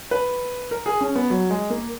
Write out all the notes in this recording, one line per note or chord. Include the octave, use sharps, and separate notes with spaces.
B4
A#4
G#4
C#4
B3
F#3
G#3
A#3